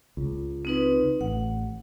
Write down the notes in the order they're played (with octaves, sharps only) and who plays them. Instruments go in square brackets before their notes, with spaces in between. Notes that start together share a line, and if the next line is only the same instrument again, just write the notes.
[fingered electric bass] C#2
[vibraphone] C4 D#4 B4
[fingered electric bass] A1 [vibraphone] F#5